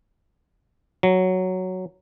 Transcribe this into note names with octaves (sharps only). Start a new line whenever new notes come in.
F#3